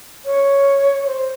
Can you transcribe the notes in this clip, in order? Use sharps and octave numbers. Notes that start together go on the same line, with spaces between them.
C#5
C5